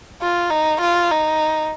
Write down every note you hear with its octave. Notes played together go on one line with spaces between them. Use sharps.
F4
D#4
F4
D#4